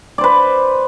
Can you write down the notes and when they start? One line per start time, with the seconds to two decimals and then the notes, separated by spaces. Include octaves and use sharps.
0.18 D5
0.21 C5
0.24 B4